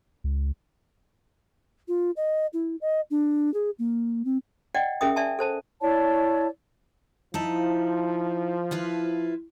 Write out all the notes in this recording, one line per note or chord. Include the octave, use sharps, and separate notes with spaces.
C#2
F4
D#5
E4
D#5
D4
G#4
A#3
C4
D5 D#5 F#5 G5
C#4 G#4 A#4 E5 G5 D#6
D5 E5 G#5 A5
A4 C5 A5
E4 C#5 D5 A5
F3 D#4 E4 A5
E4 F4 B4